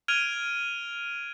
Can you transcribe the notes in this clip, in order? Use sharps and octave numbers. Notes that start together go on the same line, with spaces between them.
F6 G#6 D7 D#7 F7 G7